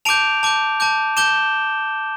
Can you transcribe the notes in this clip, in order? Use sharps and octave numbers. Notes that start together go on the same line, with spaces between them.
A5 D6 G6 D7 F7
A5 D6 G6
A5 D6 G6
A5 D6 G6 E7 G7